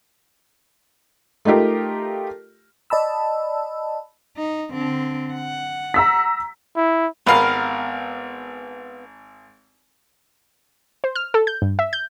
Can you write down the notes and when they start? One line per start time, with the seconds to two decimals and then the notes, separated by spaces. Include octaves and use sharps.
1.45 A3 D#4 F4 G4 A#4
2.90 D5 D#5 A5 B5 E6
4.37 D#4
4.71 D3 C4
5.34 F#5
5.94 A#5 E6 B6
6.76 E4
7.26 G#1 B3 G4 A#4 F5 G5 B5
11.04 C5
11.15 F6
11.34 A4
11.47 G6
11.62 G2
11.79 E5
11.93 G6